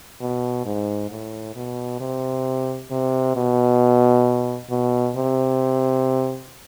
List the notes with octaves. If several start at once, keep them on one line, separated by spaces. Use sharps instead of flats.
B2
G#2
A2
B2
C3
C3
B2
B2
C3